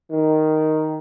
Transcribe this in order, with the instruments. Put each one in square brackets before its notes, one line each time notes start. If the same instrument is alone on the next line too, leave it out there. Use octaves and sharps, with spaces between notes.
[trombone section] D#3